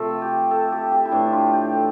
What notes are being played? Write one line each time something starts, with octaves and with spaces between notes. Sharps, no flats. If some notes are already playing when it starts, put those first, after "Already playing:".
Already playing: C3 F3 A3 A4
G4
A4
G4
G4
E4
A2 E3 A3 D4
F4
G4
A4